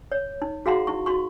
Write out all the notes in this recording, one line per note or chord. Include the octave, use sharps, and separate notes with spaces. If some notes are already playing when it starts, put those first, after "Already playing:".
C#5
D#4
F#4 G#4 F5 F#5 A#5 C6
D#4 E4 C#6
F#4 C6 C#6